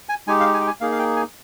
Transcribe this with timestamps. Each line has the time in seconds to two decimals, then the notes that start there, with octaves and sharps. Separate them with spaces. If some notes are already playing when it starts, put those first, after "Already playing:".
0.09 G#5
0.27 G#3 D#4 G4 G#5
0.40 F5
0.54 G#5
0.61 G5
0.67 G#5
0.81 A#3 D#4 G#4 F5
0.92 F5
0.99 G5
1.16 G#5